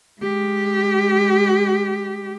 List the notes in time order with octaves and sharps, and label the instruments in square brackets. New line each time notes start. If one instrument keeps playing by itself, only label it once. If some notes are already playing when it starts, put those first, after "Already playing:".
[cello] G#3 G4